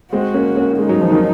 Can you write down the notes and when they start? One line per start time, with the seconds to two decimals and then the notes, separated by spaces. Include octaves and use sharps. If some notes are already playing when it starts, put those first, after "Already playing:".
0.13 G#3 C4 F#4
0.34 A#3 C#4
0.56 A#3 C#4
0.79 G#3 D#4
0.89 F#3
1.01 F3
1.12 D#3 F#3